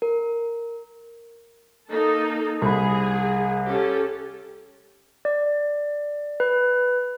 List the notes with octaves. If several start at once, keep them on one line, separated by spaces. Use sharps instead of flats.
A#4
A#3 D#4 A4
C2 G#4 B5
C#4 G4 A4
D5
B4